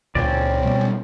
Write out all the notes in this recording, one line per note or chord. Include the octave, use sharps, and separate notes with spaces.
C#2 A#2 C4 C#4 D5
B2 G3